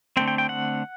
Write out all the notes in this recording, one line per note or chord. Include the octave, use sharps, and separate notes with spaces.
D3 A3 C4 G5
G5
G5
F#5